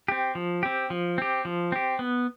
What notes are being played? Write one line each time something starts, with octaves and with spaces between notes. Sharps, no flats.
C4 G4
F3
C4 G4
F3
C4 G4
F3
C4 G4
B3